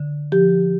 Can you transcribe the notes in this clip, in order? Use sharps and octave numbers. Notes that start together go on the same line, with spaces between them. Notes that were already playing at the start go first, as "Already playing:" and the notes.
Already playing: D3
F3 G4